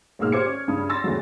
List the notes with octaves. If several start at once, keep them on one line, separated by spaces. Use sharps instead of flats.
B1 G#2 G#3 A#3 E6 F6
G4 C5 D6 G#6 C#7
C#4
C#2 G2 D#6
C6 E6 A6 A#6
E2 A2 C#3 F#3